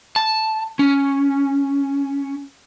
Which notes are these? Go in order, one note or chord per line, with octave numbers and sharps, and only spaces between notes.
A5
C#4